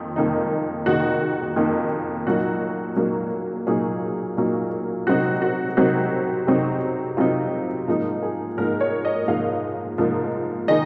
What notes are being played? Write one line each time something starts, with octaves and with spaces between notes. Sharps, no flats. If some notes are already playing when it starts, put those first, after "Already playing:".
Already playing: F2 D#3 A#3
F2 D#3 A#3 D#4
F2 D#3 A#3 D#4 F#4
F2 D#3 A#3 D#4
A#2 F#3 A#3 D#4 F#4
A#2 F#3 A#3 D#4
A#2 F#3 A#3 D#4 G#4
A#2 F#3 A#3 D#4
C3 F#3 C4 D#4 F#4
F#4
C3 F#3 C4 D#4 F#4
C3 F#3 C4 D#4
C3 F#3 C4 D#4 F4
G#2 F3 A#3 D#4
G#4
G#2 F3 A#3 D#4 A#4
C#5
D#5
G#2 F3 A#3 D#4 F5
G#2 F3 A#3 D#4
D#3 G#3 D#4 D#5